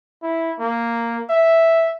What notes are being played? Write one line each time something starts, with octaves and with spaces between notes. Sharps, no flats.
E4
A#3
E5